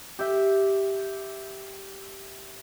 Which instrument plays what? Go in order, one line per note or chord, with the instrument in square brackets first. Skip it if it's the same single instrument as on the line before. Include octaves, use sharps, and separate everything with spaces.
[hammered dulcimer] G4 E5 G5